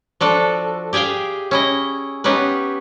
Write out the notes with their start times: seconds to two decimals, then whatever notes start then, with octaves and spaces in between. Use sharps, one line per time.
0.21 F3 D4 F#4 A4
0.93 G4 G#4 E5 F5 G5
1.51 C#4 E4 D#5
2.24 B3 C#4 D#4 G4 B4